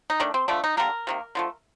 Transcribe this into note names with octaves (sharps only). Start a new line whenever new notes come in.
D#4
D#3 A3 D4
C4
D3 F3 A3 D4
D#4
D3 G3 A#3 A#4
C3 D#3 A#3
D3 F3 A3